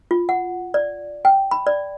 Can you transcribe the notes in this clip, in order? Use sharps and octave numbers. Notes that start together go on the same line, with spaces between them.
F4
F#5
D5
G5
B5
D5